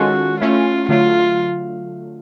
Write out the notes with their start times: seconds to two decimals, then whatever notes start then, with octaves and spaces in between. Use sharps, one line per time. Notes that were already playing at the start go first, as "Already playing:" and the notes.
Already playing: D#3 G#3 C#4 F4 F#4 A4
0.40 A3 C#4 E4 F4
0.89 D3 F#3 A3 F4